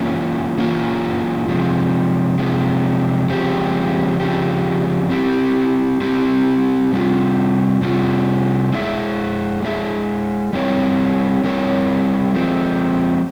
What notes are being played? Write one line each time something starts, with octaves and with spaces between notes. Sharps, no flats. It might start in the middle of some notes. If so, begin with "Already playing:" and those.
Already playing: E3 A#3 C#4 F4
E3 A#3 C#4 F4
C3 F3 G#3
C3 F3 G#3
C#3 F3 G#3 C4 G4
C#3 F3 G#3 C4 G4
C4 E4 G4
C4 E4 G4
C3 G3 C4 F4
C3 G3 C4 F4
G#3 E4 G#4 E5
G#3 E4 G#4 E5
G3 C4 E4 A#4 C#5
G3 C4 E4 A#4 C#5
F3 G#3 C4